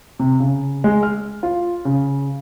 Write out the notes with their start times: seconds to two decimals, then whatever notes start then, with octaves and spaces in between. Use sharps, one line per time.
0.19 C3
0.40 C#3
0.84 G#3
1.03 F6
1.43 F4
1.85 C#3